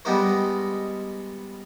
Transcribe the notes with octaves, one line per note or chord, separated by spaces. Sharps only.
G3 G#3 B3 D#4 A#4 C5